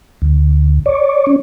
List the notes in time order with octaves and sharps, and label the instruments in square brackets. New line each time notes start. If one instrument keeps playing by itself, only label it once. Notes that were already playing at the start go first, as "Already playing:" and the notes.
[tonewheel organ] D2
C#5 D5
C#4